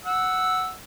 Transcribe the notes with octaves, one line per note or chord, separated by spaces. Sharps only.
F#5 E6